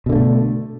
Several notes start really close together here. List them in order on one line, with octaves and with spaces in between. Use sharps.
B2 D3 A#3 A3